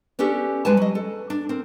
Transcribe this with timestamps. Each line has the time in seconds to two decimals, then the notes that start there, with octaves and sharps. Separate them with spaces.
0.19 B3 C#4 D4 G4 A4
0.65 G3 G#3 B4 G#5 A5
0.77 F#3 D#5
0.95 A4
1.30 D4
1.49 C4 A#4